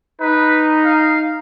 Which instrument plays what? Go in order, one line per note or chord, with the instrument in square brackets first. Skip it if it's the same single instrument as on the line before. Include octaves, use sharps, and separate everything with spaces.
[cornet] D#4 [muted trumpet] B4
[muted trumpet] F5